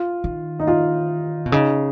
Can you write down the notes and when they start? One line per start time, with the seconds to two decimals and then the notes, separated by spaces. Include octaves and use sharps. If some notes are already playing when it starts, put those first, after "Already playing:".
Already playing: F4
0.24 D#3
0.60 D#4
0.67 F4
1.46 B2
1.52 C#3 D#4